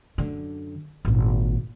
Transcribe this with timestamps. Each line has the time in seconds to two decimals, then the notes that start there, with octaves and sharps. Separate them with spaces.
0.18 F#2 D3
1.05 G#1 A#2